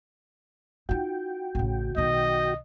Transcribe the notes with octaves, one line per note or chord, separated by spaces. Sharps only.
D#4 F4 F#4 G5
A1 C#3
B1 D#3 D#5